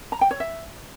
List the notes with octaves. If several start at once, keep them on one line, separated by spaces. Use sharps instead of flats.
A#5
G5
C#5
E5